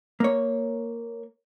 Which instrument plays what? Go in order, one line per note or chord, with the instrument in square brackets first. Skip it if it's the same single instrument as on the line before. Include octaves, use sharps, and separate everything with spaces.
[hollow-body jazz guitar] A#3 C#5